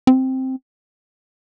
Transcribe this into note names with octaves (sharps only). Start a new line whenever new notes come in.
C4